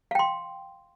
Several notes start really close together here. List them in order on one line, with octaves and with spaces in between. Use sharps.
F5 G5 C6